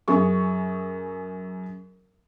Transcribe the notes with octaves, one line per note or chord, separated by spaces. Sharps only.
F#2 G#4 C#6